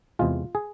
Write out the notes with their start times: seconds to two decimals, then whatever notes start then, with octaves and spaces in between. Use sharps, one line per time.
0.19 E2 C3 G#3 F4
0.55 G#4